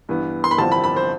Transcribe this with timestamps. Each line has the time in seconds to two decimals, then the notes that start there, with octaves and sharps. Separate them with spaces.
0.09 G2 E3 B3
0.44 C6
0.51 B5
0.58 A1 G2 D3 F3 C4 A5
0.72 B5
0.84 B5
0.96 C5